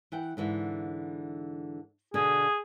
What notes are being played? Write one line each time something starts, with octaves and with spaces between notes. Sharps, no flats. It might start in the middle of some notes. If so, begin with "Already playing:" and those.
E3 F#5 G5
G#2 D3 E3
B2 D3 G#4